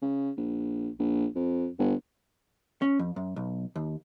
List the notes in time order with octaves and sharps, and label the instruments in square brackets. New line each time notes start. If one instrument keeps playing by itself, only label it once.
[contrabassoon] C#3
A#1
A#1
F2
G1
[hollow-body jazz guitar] C#4
F2
F#2
B1
D#2